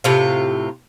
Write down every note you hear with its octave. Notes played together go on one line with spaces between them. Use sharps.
A2 C3 F4